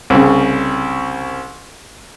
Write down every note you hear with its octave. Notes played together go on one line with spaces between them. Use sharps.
C2 C#3